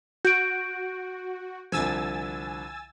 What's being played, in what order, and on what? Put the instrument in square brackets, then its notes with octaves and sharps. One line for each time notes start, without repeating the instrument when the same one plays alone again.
[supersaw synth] F#4 [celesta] G6 D7
[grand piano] C2 D3 F3 [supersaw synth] G#5 E6 A6